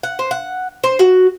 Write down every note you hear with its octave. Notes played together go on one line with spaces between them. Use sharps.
F#5
C5
F#5
C5
F#4